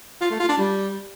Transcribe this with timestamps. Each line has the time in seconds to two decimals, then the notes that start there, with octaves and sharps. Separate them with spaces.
0.21 F4
0.30 A3
0.39 F4
0.49 D4
0.58 G3